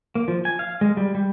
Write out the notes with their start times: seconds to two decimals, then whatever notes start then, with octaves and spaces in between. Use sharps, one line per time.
0.15 A#3
0.28 F3
0.45 G#5
0.59 F5
0.81 G#3
0.97 G3
1.15 G3